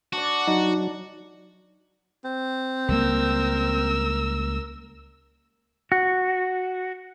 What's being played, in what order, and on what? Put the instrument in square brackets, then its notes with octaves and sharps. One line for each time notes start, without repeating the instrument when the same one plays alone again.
[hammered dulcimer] D4 D5 [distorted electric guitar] F#4
[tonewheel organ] F#3 [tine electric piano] D#4
[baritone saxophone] C4
[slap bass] C#2 G3 A#3 [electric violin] A#4 E6
[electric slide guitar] F#4